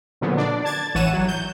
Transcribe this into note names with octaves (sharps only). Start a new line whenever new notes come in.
A#2 D3 F3 F#3 B3
D4 D5
A5 G#6 A6
A1 E3 C#5 F#5 D#7 E7
F#3
G6